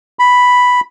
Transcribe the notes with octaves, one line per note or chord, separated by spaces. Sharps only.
B5